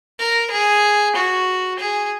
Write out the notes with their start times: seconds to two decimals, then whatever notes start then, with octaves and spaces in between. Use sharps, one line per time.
0.20 A#4
0.51 G#4
1.16 F#4
1.79 G#4